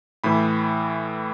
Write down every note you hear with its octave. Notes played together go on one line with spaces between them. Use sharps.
A2 E3 B5